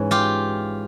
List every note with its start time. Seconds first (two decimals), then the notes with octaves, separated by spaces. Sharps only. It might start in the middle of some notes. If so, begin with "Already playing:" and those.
Already playing: G#2 E3 C#4
0.11 F4 G4